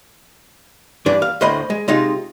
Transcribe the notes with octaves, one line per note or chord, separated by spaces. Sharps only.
G2 E3 D4
F5
D2 A2 C5 D#5 B5
G#3
C3 G#3 D#4 F4